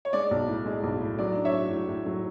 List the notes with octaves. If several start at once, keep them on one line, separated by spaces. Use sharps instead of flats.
C#5
G#3 D5
B1
A2
G#3
B1
A2
F#3 D5
D4
C#5 E5
F#3
A2
A2
F#3